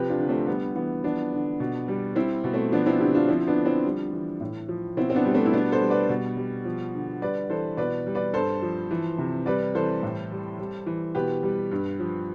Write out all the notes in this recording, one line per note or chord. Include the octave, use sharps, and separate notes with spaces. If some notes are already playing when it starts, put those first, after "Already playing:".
Already playing: C3 F3 G4 B4
D4 F4
D3
A3 C4
G3 B3
E3 B3
F3 B3 D4
D3
B2
G3
G3 C4 E4
B2
A3 C4
F3 B3 D4
C4 E4
D3 E4 G4
D4 F4
F3 C4 E4
B3 D4
D3
C4 E4
G3
E3
A2
F3
B2 C4 E4
C4
B3 D4
G3
A3 C4
E4
B2 B3 D4
A4 C5
G3
B4 D5
B2
G3
F3
D3
G3 B4 D5
E3 A4 C5
B2 B4 D5
G3
B4 D5
G2 A4 C5
F3
E3
C3
G3 B4 D5
E3 A4 C5
A2
G3
G3
E3
B2 G4 B4
G3
G2
F3